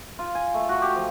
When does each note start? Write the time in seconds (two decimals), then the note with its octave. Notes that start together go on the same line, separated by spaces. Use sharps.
0.19 F4
0.35 G#5
0.54 A3
0.69 F#4
0.82 G4
0.95 F3